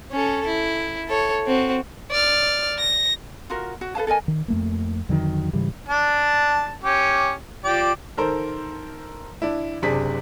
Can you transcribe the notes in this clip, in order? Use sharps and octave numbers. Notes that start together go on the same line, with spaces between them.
C#4 A4
E4
A4 C#5
C4 F#4
D5 F6
A#6
F4 F#4 A#4
F#4
A4 B4 F5 A5
A4 A#4 D#5 G#5
D#3
F2 A3 A#3
F2 D3 D#3 F#3
G#2 C#3 E3 G3
D4 A5
C#4 G4
F3 G4 D5
D#3 A4 A#4 C5
D4 E4
F#1 C3 D4 G#4 B6